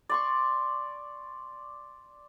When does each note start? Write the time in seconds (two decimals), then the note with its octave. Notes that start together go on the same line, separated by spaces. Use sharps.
0.09 D5 C6 C#6